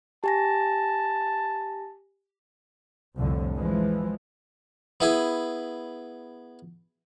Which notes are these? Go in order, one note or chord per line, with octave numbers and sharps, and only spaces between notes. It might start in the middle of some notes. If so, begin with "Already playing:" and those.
G4 G#5 A5 A#6
C2 F2 A2 D3
E3 F3 G#3
B3 E4 G#4